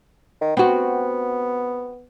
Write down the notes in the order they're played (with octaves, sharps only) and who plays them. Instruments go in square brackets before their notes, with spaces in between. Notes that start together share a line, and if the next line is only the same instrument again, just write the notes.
[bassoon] D#3
[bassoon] B3 [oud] C4 F#4